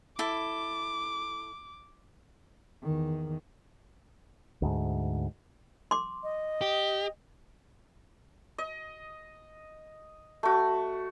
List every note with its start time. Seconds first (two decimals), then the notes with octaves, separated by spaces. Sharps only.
0.19 E4 A4 D6
2.82 E2 D#3
4.62 D2 G#2
5.91 C6 D6
6.23 D#5
6.61 G4
8.58 D#5
10.43 A3 F#4